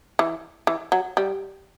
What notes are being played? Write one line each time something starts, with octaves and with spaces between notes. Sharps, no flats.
E3
E3
F#3
G3